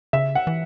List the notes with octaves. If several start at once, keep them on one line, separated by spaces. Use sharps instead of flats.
C#3 E5
F#5
E3